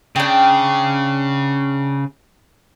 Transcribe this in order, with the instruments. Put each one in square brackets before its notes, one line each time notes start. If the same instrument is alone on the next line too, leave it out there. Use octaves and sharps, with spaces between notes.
[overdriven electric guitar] C#3 [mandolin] D4 G5